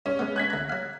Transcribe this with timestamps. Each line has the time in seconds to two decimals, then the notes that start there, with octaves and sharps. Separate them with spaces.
0.06 G2 C#4
0.19 G#3 B3
0.36 F#6 G#6 B6
0.50 D2 A#5
0.69 F#3 F5